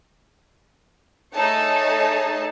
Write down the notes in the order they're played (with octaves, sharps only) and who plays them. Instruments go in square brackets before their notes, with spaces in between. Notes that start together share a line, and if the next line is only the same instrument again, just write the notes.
[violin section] A3 D#4 G#4 A4 C#5 A5